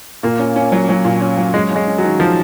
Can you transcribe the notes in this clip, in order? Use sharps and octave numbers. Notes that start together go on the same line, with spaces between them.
A#2 A#3
C#4
C#4
F#3
F#3
A#2
C#4
F#3
G#3 C#4
G#3 C#4
C#4
F#3
D#3
D#3 F3